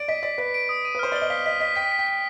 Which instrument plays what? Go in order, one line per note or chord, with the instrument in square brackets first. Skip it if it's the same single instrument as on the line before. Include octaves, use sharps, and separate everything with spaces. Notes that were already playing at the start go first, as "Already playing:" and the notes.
Already playing: [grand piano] D5 [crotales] D7
[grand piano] D#5 [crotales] B6
[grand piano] D5 [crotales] B6
[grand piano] B4 [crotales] B6
[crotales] D7
D#6
D#7
[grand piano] B4
[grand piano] C5 [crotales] F6
[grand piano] D5 [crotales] G7
[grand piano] D#5
[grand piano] F5 [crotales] B6
[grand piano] D#5 [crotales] B6
[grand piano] D#5 [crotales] B6
[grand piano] G5 [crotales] B6
[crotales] B6
[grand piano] G5
[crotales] B6